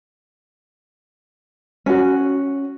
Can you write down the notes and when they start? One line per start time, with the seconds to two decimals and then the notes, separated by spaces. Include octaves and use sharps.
1.86 C#4 F#4